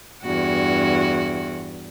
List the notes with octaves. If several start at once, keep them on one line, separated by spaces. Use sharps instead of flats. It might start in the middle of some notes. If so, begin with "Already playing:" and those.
E2 G2 F#4